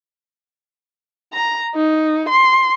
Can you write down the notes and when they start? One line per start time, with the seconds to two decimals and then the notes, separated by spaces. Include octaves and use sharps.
1.33 A#5
1.75 D#4
2.29 C6